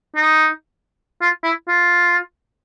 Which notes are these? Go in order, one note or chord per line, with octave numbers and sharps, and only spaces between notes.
D#4
F4
E4
F4